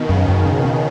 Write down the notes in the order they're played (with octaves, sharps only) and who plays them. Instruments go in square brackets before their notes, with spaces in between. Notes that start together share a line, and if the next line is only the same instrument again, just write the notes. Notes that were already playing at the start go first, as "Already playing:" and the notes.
Already playing: [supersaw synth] B2 D#3
[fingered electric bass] F#2 [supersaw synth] C#3
[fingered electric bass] F#2
C#4
C#4